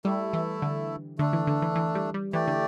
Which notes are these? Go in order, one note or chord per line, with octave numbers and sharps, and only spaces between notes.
G3 A3 E4 A4
E3
D3
D3 A3 D4 A4
E3
D3
E3
E3
G3
G3
E3 A3 G4 D5
D3